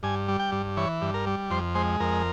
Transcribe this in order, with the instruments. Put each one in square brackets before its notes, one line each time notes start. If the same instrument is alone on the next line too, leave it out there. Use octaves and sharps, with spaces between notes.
[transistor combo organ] G2 G#5
G3
G5
G2
E3 C#5
G2
A#4
G3
F2 C5
G#3 C5
F2 A#4